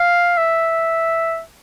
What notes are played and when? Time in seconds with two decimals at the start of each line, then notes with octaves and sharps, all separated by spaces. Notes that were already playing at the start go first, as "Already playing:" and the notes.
Already playing: F5
0.37 E5